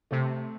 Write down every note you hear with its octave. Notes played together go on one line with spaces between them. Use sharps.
C3 A3